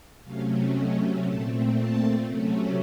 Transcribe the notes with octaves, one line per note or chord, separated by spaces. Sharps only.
C3 F#3 A3 C#4 F5
D#5
A#2 A3 C4 A5
A5
C3 F#3 A3 C#4